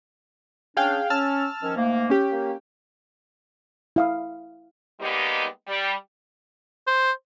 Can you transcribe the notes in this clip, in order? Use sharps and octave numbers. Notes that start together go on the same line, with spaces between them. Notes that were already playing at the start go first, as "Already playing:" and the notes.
C#4 D4 G#4 F5 G5
C#4 A5 E6 F6
D#3 F3 C#4
G#2 A3 A#3
C#4 G4
A#3
E4 F5 D#6
G3 G#3 A#3 B3 D#4 G4
G3
C5